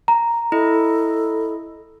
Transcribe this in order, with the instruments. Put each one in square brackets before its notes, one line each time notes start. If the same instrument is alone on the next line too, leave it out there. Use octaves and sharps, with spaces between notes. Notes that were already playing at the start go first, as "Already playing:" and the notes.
[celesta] A#5
[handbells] E4 D#5 [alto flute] A4